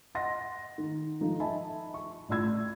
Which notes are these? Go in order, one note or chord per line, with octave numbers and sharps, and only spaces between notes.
D#5 F#5 C6 A#6
D#3
F3 D#4 A4
D#5 E5 G#5 A5 B5
C#6
A1 F4 D5 B5 E6 G#6